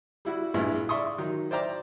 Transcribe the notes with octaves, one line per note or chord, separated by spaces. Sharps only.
G3 E4 F#4
A#1 G2 G#3 E4
D5 E5 C6 C#6 D#6
D#3 F#3
C5 D5 E5 G5 A#5 D6